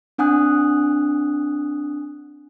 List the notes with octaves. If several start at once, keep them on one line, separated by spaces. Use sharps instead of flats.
C4 D4 F#5 G#5 D#6 F#6